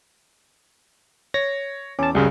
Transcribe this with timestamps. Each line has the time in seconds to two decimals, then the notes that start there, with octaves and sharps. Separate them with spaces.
1.34 C#5 A#6
1.99 E2 C#4 A5 D6
2.15 C#2 F#2 C#3 G3 G#4